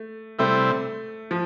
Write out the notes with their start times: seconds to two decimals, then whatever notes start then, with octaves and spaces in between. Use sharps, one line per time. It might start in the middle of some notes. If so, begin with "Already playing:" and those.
Already playing: A3
0.39 C3 G3 A3 C4 E4
1.31 F3